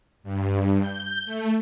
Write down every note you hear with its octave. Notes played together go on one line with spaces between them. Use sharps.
G2
G6
A3